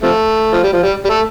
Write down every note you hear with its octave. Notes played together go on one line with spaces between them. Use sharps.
C3 F3 A3
F3
G3
F3
G3
G3
A3